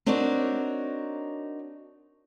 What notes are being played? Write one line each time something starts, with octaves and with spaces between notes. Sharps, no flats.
C4 D4 D#4 F#4 A#4 C#5